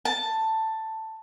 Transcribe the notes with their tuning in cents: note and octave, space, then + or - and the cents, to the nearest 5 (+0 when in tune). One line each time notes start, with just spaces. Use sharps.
A5 +10